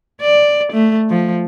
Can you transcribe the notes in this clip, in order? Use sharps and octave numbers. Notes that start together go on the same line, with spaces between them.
D5
A3
F3